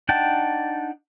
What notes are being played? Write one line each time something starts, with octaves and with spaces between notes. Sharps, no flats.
D4 D#4 F#5 G5 A5